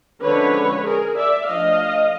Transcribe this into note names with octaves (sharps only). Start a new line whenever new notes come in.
D3 F3 G#3 C#4 B4 C#5
G#4 A#4
D5 E5
F3 A3 D4 D#5 F5